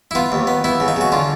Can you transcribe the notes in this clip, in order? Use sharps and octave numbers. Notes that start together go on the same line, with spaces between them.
E4
B3 F4
D#2
B3
B3 E4
C#3
D#4
C#3 F#4
D3 F4